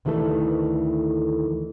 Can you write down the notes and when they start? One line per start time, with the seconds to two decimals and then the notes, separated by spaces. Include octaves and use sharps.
0.05 D2 D#3 E3 A3 A4